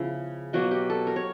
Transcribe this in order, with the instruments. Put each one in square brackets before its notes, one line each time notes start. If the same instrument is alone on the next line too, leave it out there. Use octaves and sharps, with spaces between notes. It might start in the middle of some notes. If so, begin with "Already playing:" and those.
Already playing: [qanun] C#3 F3 B3 E4
B2 F#3 A#3 F#4
G4
A4
A#4
C#5